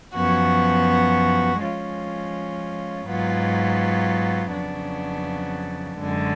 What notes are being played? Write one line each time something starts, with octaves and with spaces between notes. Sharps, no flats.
F#2 F3 B3 F#4
F3 G#3 C#4 F4
G#2 F#3 B3 F4
F2 C#3 F#3 B3 D4
F#2 D3 G#3